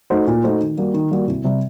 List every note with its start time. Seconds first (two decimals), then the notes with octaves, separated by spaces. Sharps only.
0.10 A3 D#4 F#4 C5
0.27 A#2
0.44 A3 D#4 F#4 C5
0.60 D#3
0.77 G3 A#3 F#4
0.94 D#3
1.11 G3 A#3 F#4
1.28 C2
1.44 C3 G3